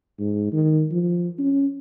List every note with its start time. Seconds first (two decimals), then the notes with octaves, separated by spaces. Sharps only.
0.19 G#2
0.53 D#3
0.91 F3
1.39 C#4